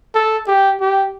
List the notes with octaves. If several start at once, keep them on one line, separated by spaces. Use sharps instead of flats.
A4
G4
G4